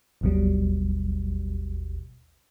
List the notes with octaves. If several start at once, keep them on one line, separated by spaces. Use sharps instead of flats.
G#1 D#2 B2 F#3 G3